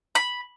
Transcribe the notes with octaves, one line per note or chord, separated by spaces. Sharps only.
B5